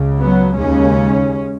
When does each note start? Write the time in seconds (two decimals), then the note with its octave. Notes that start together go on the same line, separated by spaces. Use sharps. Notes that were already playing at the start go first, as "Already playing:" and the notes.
Already playing: C#2 C#3
0.18 F#3 B3
0.56 D#2 C#3 G#3 C#4